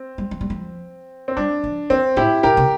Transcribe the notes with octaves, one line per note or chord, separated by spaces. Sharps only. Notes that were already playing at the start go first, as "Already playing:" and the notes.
Already playing: C4
G3
F3
G3
F3
C4
G3 D4
F3
F3 C4
A2 E4 G4
A#2 G4 A#4
C3